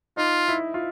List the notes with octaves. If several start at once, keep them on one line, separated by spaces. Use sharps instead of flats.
D#4 F4
E4
F4